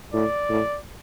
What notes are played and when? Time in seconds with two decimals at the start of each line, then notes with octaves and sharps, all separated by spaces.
0.13 A2 D5
0.49 A2